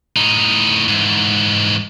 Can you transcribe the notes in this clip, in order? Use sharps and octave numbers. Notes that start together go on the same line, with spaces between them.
A2 D#4
G#2 E3